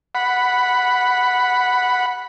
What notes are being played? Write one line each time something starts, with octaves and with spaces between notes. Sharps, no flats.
F#5 B5